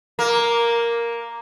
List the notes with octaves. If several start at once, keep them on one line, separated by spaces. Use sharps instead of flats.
A#3